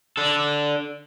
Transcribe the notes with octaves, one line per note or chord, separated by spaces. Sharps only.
D4 A4